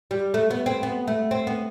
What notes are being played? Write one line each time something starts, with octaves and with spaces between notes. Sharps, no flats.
G3
A3
B3
C4
B3
A3
C4
B3